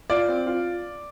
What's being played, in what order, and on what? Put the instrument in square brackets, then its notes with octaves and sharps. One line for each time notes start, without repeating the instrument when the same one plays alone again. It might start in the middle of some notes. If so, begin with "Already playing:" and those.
[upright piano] F4 [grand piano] D5
[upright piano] C4
F4